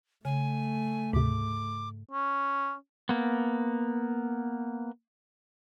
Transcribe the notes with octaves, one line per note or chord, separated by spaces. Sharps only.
C#3 A3 G#5
D2 G#2 C3 D6
C#4
A#3 B3